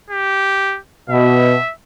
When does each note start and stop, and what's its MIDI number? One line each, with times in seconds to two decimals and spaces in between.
0.10 0.79 67
1.10 1.55 47
1.10 1.72 76